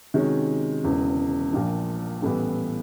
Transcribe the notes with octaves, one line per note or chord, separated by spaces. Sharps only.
C3 D#3 G#3 C#4 F#4
E1 E2 C#3
A#1 A#2 F3
A1 A2 E3 G3 B3